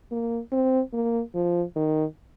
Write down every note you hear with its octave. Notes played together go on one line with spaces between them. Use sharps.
A#3
C4
A#3
F3
D#3